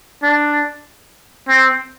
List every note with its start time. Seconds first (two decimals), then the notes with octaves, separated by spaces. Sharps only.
0.23 D4
1.48 C4